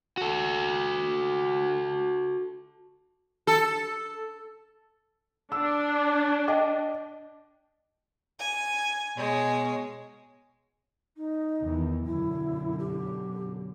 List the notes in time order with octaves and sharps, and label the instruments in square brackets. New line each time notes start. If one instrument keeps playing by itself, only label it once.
[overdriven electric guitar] F#4 A4
[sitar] A4
[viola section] D4 [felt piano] E6
[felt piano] D#5 G5 D6
[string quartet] G#5
B2 G#3 C#5
[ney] D#4
[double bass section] E2 D#3 E3
[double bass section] F#2 B2 D3 [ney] E4
[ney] G4